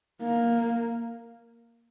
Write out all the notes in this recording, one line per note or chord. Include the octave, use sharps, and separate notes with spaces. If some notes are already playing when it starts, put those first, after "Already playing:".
A#3